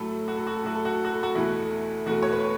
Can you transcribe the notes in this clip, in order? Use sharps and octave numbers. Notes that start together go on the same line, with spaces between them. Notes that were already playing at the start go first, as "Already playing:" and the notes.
Already playing: A2 F#3 A3 A4
F#4
A4
F#4
A4
A2 F#3 A3 F#4
A4
F#4
A4
F#4
A4
F#4
E2 B2 A3 E4
E2 B2 A3 F#4
C#5
B4